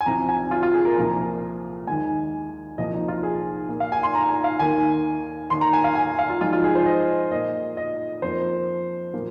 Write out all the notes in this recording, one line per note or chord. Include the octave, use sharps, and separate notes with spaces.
G#5
C2 C3 F3 A#5
G#5
F4
F4
G#4
A#4
C2 A#2 F3 A#3 A#5
D#2 D#3 G#3 G#5
C2 A#2 F3 A#3 D#5
D#4
F4
G#4
A#2 A#3
F5
G#5
C6
A#5
G#5
F5
D#2 D#3 A#3 G#5
D#2 D#3 A#3 C6
A#5
G#5
F5
G#5
F5
F4
G#2 F3 G#3 F4
F4
G#4
C5
D#5
A#2 A#3 D#5
D#5
F2 F3 A#3 C5
A#2 F3 A#3